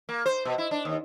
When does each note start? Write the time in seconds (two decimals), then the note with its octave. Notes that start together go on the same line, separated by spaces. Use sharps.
0.09 A#3
0.26 C5
0.45 B2
0.58 E4
0.71 D4
0.85 D#2